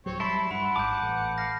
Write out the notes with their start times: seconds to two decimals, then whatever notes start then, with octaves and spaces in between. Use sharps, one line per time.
0.06 D1 F#3 C4 C#5
0.20 G3 E4 A5 B5 C6
0.51 G2 F#5 B5
0.76 G#1 A5 D6 G6
1.02 A1
1.38 F5 A#6